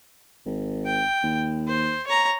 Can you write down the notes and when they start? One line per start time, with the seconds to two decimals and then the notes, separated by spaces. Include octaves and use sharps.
0.46 G#1
0.86 G5
1.24 D#2
1.68 C5
2.07 C#5 A#5